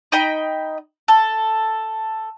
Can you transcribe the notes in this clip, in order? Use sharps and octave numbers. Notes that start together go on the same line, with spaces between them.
D#4 D#5 G5 B5
A4